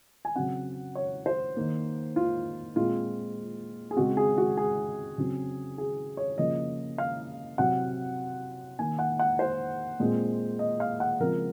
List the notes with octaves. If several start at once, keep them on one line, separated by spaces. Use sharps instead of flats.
G#5
C#3 F#3 C4 F#5
C#5
C5
D#3 A#3
F4
A#2 G#3 C4 F4
G#4
C#3 G#3 C4 F#4
G#4
F#4
G#4
C#3 F#3 C4
G#4
C#5
C#3 F3 A#3 D#5
F5
C3 F#3 C4 F#5
D#3 A#3 G#5
F#5
F#5
C5
A#2 G#3 C4
D#5
F5
F#5
C#3 F3 G#3 C4 A#4